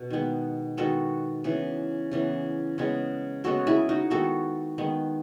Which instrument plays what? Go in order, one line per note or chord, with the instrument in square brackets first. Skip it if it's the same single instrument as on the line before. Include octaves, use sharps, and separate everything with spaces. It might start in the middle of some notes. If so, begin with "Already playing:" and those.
Already playing: [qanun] B2
D#3 G#3 B3
D#3 G#3 B3 F#4 A4
C#3 E3 B3
C#3 E3 B3
C#3 G#3 B3
C#3 G#3 B3 F#4 A4
E4 G#4
D#4 F#4
D#3 G#3 B3 F#4 A4
D#3 G#3 B3